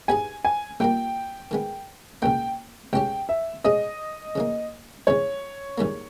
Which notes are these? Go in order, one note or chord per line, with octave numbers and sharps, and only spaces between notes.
G2 G3 B3 D#4 G#4 G#5
G#5
A#1 A#2 G3 A#3 G5
D#3 G#3 B3
C#2 B2 A#3 G5
C#2 B2 G#3 C#4 G4 G5
E5
B2 G#3 C#4 G#4 D#5
C#3 E3 A#3
E2 C#3 E3 G#3 C#5
A#1 G#2 D#3 G3 A#3